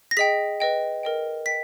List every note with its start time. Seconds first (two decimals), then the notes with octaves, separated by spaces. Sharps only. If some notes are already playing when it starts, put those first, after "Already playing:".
0.11 A#6
0.17 G#4 D#5 G5 B6
0.60 B4 D#5 G5
1.03 A#4 D#5 G5
1.46 D#5 G5 B6